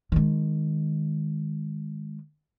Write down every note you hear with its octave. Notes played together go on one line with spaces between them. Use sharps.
D#3 G#3